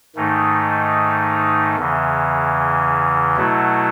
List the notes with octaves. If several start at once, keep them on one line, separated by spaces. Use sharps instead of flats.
G#2 D#3 A3 D#4
E2 C#3 E3
B2 F#3 A3 E4